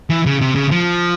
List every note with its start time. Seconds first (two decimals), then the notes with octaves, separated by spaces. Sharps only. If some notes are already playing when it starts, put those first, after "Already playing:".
0.10 E3
0.26 C#3
0.41 C3
0.55 C#3
0.71 F3